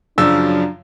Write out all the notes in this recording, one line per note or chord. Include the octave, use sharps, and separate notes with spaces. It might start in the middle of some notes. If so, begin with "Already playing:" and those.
F#2 C#3 F3 F#3 D4 E6